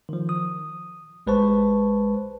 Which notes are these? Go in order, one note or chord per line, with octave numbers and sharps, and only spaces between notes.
D#3 F3
D#6
A1 G#3 B4 C5 A5 C#6